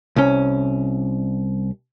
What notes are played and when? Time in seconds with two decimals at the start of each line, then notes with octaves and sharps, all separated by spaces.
0.16 C2 C#4